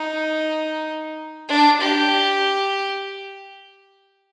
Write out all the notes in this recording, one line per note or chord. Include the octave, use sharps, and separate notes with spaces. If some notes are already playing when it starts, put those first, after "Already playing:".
Already playing: D#4
D4
G4